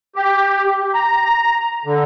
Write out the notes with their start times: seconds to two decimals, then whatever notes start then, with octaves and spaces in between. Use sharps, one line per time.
0.16 G4
0.94 A#5
1.85 D3